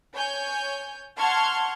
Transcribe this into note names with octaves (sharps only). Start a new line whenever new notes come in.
C#5 G#5 G6
F#5 A5 C6 C#6 F6 G#6